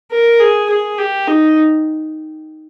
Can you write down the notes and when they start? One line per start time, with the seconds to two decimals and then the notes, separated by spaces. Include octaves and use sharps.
0.11 A#4
0.40 G#4
0.70 G#4
0.98 G4
1.27 D#4